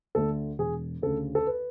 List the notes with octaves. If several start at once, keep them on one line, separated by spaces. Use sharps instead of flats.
D2 D3 A3 A4
E1 G#4
D2 C#3 A4
A4
B4